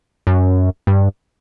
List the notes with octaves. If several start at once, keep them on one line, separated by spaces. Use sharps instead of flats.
F#2
G2